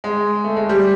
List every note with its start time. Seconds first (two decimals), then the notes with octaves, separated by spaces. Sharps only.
0.04 G#3
0.44 A3
0.56 G#3
0.69 G3